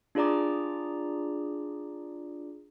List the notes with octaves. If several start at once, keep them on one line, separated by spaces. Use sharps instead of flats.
D4 F4 G#4 D5 A#5 D6